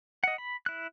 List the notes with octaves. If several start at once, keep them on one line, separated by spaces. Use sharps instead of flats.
D#5 F#5
B5
E4 F#6